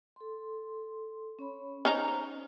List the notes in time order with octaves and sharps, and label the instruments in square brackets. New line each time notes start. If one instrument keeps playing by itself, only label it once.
[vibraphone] A4 C6
C#4 C#5 B5
[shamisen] C#4 D#4 A#5 [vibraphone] C5